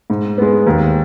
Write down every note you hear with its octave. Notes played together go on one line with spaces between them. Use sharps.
G#2
G#3 B3
D#2